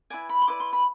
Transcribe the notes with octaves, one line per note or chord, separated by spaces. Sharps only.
E4 B4 D5 G#5
B5
C6
E4 B4 D5 D6
C6
B5